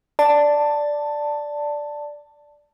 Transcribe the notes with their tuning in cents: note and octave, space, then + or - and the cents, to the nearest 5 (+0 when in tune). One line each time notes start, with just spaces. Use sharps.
D5 +0 A5 +10